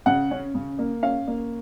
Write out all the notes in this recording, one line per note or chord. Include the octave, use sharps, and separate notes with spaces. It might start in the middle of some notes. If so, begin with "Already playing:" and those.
C#3 F#5
C#4
C#3
A#3
C#4 F5
A#3